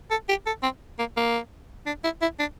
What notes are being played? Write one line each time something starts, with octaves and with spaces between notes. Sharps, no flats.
A4
G4
A4
C4
A#3
A#3
D4
E4
E4
D4